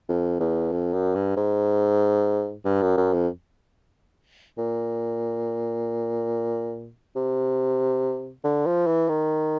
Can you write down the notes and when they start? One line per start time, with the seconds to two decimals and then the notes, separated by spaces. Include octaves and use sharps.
0.09 F2
0.40 E2
0.72 F2
0.94 F#2
1.15 G2
1.37 G#2
2.65 G2
2.82 F#2
2.98 F#2
3.14 F2
4.58 A#2
7.16 C3
8.45 D3
8.66 F3
8.87 E3
9.09 D#3